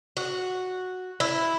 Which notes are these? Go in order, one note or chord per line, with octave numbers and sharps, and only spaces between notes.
F#4
E4